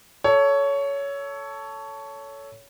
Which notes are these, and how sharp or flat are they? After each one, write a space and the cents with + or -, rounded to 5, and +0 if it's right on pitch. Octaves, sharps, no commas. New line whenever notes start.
A4 +0 C#5 +15